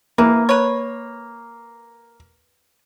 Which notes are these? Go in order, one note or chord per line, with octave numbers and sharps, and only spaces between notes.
E3 A#3
B4 C#5